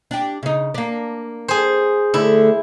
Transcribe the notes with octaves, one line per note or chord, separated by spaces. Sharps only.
D4 G4
C#3 D#4
A#3 D4
G#4 C5
D3 A3 E4